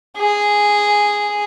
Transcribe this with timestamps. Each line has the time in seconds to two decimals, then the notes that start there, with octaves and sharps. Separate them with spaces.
0.18 G#4